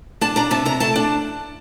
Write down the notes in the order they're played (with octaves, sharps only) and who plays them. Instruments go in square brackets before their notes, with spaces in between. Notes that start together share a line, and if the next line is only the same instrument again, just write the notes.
[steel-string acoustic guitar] D4 A5
D4 A#5
C3 A5
C3 A#5
A3 A5
D4